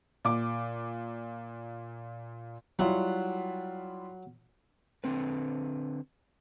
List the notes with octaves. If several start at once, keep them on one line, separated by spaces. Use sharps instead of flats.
A#2 D6
F#3 G3 E4 F4 F#5
D3 C4 B4